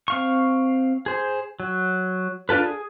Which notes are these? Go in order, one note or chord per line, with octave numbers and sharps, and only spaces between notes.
C4 F5 C#6
G#4 C5
F#3
D4 F4 A4 B4
G#4